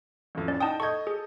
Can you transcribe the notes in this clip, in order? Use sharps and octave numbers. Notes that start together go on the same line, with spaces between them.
A1 F2
C#4 D5
D#4 F#5 G5 A5 D#6
A4 D#5 C#6 G6 G#6
G#4